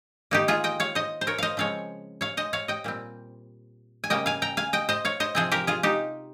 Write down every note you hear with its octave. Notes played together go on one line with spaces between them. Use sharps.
D#3 A#3 D#4 G4
F4 G#4
D#5 G5
C#5 F5
C5 D#5
C5
A#4 C#5
C5 D#5 F5
C#3 F3 G#3 C4 C#5 F5
C#5 F5
C5 D#5
C#5 F5
D#5 G5
A#2 G3 C4
G#5
C#3 G3 A#3 D#5 G5
F5 G#5
G5 A#5
F5 G#5
D#5 G5
C5 D#5
C#5 F5
C5 D#5
C3 F3 C4 G#4 C5
G4 A#4
F4 G#4
D#4 G4